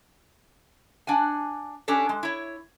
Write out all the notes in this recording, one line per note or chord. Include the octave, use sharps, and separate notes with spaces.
D4 F#5 G#5
C#4 D4 G4 A4
G#3
E4 C#5